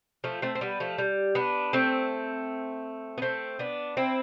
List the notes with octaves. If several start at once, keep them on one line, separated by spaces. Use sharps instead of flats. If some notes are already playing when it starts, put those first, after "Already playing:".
F3 A3
A3 C4
C4
G3 B3
F3 A3
G3
B3 D4
A3 C4
B3
A3 C4
B3 D4
C4 E4